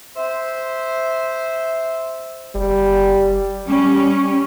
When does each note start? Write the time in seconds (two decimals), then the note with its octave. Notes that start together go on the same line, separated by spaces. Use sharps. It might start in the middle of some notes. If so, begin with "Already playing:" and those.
0.16 C5 E5
2.55 F#1 G3
3.66 G3 C#4